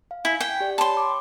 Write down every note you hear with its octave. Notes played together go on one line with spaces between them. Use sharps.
F5
E4 G#5
G5
G4 D5
C#5 G5 A5 B5 C6
D6